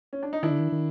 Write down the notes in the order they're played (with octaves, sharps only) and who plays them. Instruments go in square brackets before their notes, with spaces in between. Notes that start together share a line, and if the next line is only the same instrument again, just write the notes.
[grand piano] C#4
D4
D#4
[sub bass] D#3 [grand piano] D4 E4
[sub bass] D3
D#3
D#3